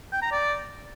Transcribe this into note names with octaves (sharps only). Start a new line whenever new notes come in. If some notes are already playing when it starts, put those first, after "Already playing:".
G5
A#5
D5